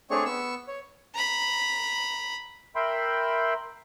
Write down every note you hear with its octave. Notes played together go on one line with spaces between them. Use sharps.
A3 C4 D4 G#4 C#5 C#6
B3 C#6 E6
C#5
A#5 B5
A#4 E5 G5 B5 C6